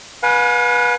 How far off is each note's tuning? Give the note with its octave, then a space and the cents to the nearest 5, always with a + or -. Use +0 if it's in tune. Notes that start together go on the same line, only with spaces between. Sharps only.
B4 -20 F5 +45 G#5 +10